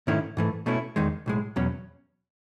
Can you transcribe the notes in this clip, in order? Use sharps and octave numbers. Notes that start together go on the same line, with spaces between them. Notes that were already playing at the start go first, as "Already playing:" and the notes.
G#2 D#3 A3 C#4 E4
G#2 E3 A3
B2 A3 C#4 E4
E2 D#3 G#3 D#4
B1 A2 G#3
E2 B2 F#3 C#4